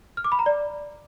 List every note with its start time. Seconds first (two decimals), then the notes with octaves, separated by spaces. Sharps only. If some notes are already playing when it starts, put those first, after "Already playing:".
0.17 F6
0.24 D6
0.32 B5
0.39 A#5
0.46 D5